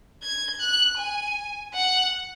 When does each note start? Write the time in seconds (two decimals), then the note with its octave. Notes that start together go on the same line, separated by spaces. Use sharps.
0.22 G#6
0.60 F#6
0.98 G#5
1.74 F#5